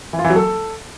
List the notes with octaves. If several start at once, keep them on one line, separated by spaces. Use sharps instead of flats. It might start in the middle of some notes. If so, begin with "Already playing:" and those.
E3
F4
E3
F#3
A4